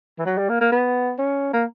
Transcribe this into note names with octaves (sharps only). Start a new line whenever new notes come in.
E3
F#3
G3
A#3
A#3
B3
C#4
A#3